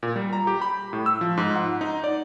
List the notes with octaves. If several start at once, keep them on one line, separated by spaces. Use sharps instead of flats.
A#2
G3
A#5
G4
B5
A2
E6
F3
G#2
F#5
D#4
D5